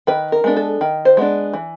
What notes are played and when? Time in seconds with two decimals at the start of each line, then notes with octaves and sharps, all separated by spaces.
0.07 D#3 B4
0.32 A#4
0.44 G#3 B3 D4
0.57 A4
0.81 D#3
1.05 C5
1.17 G#3 B3 D4
1.53 E3